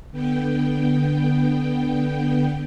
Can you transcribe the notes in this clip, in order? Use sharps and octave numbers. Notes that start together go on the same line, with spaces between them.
D3 B3 G5